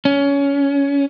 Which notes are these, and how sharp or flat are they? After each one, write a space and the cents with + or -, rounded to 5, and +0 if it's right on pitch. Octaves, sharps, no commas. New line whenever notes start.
C#4 +20